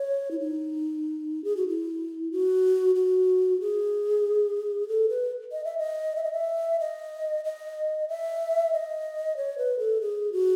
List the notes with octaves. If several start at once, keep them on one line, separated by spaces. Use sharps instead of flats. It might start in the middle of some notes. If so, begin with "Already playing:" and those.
Already playing: C#5
E4
D#4
G#4
F#4
E4
F#4
F#4
G#4
A4
B4
D#5
E5
D#5
E5
D#5
E5
D#5
D#5
E5
D#5
C#5
B4
A4
G#4
F#4